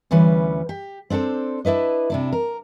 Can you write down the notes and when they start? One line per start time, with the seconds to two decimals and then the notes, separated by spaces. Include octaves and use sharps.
0.11 D2 E3 G3 C#4 B4
0.69 G4
1.10 C4 D4 G4 A4 C5
1.65 D4 E4 B4 D#5
2.10 C3 D4 E4
2.33 A#4